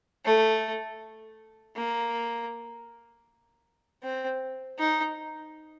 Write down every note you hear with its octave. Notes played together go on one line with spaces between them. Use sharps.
A3
A#3
C4
D#4